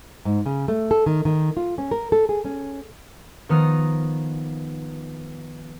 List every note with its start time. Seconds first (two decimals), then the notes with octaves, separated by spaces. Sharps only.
0.25 G#2
0.46 C#3
0.68 A3
0.91 A4
1.06 D#3
1.25 D#3
1.57 F4
1.78 C#4
1.91 A#4
2.12 A4
2.29 G#4
2.45 C#4
3.49 D#3 F3 B3 A#5 D#6 F6